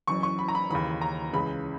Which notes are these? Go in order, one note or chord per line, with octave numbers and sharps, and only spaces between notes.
F#1 F#2 E3 C#6
C#6
B5
A#5
B5
D#2 C#3 E3 B5
A#5
C#2 C#3 E3 B5